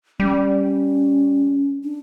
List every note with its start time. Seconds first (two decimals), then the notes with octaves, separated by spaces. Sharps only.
0.20 G3 C#4
1.84 D4